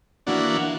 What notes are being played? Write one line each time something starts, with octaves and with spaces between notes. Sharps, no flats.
E3 A#3 D4 F#4